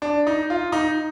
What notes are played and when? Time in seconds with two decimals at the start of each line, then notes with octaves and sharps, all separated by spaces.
0.02 D4
0.27 D#4
0.50 F4
0.72 D#4